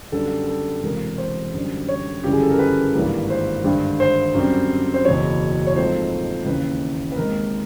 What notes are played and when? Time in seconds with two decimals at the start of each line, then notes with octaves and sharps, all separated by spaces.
0.12 F#2 D3 G3 B3 A4
0.47 A4
0.83 E1 E2 C3 A#4
1.18 C5
1.53 F#2 D3 G3
1.88 C#5
2.24 G1 F#2 C#3 E3 G3 G4
2.32 G#4
2.42 A4
2.50 A#4
2.59 B4
2.94 G#1 G2 E3 G3 A#3
3.30 C5
3.64 G#1 G2 D3
4.00 C5
4.34 F#2 D3 G3 C4
4.94 C5
5.05 F#1 E2 B2 F#3 C#5
5.67 C#5
5.76 G#2 F3 A3 C4 C5
6.46 D#2 C#3 E3 B4
7.12 B4
7.16 D#2 D#3 G#3 C4 A#4